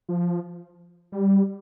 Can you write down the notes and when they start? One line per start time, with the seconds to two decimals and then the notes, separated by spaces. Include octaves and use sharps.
0.09 F3
1.12 G3